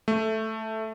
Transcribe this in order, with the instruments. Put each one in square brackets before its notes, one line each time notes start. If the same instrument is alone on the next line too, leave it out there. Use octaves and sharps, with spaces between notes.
[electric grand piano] A3